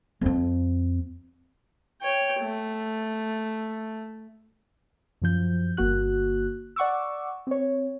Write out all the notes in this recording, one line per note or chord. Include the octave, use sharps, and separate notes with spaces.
F2 C4
C#5 G5
A3
F#2 F3 G6
G1 A#3 F#4 F#6
D5 F#5 C#6 D6 E6
C4 C#5